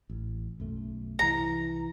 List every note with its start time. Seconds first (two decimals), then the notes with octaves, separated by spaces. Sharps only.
0.10 A1
0.60 B1 F#2 A3
1.19 C2 E3 A#5